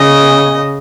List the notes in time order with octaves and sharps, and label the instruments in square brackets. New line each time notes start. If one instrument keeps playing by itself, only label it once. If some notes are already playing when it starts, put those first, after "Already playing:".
Already playing: [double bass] C#3 [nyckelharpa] D#5